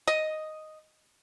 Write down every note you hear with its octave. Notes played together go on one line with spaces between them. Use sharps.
D#5